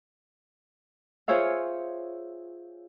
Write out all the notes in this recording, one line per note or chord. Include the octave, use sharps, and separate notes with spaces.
F4 G#4 C5 C#5 E5 F5